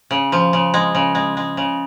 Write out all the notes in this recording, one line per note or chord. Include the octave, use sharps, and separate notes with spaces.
C#3
F3
C#3
G#3
C#3
G#3
G#3
C#3